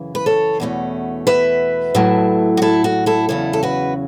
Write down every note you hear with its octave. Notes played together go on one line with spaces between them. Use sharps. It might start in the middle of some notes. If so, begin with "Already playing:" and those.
Already playing: F#2 C#3 E3
B4
A4 C#5
E2 B2 A3 C#4
B4 E5
A2 F#3 A3 E4
F#4
E4 A4
F#4
E4 A4
E2 C#3 F#3 C#4 E4 A4
A4
F#4 B4